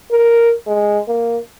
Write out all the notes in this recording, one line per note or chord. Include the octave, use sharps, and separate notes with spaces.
A#4
G#3
A#3